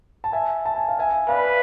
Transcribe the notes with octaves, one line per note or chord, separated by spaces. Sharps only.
A5
E5 G#5
A5
G#5
F5
E5 G#5
B4 D5 F5